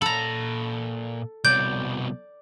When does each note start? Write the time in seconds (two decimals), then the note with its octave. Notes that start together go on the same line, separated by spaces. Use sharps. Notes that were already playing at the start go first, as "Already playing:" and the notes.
0.02 A#2 A4 A#5 B5
1.45 C2 B2 D5 G6